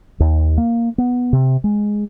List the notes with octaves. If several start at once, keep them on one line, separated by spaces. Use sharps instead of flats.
D#2
A#3
B3
C3
G#3